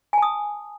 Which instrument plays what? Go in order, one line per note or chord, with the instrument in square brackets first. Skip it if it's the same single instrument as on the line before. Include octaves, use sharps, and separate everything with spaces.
[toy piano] G#5
A5
D#6